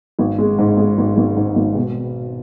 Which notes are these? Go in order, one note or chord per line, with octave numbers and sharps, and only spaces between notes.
G#1
G#3
G#2
G#3
G#1
G#1
G#2
G#1
B2